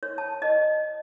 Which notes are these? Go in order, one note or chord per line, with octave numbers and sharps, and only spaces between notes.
C#5
A5
D#5